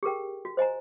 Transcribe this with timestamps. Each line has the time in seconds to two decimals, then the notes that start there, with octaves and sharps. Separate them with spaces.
0.03 G4 G#4 A#4 G5
0.45 F#4
0.57 C5 D#5 G#5 A#5